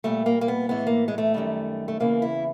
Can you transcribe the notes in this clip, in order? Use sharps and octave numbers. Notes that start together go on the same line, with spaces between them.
A#2 G3 A3
A#3
A#3
B3
A2 E3 G#3 B3
A#3
G#3
A3
F#2 D#3 G3
A3
E2 C#3 E3 A#3
E4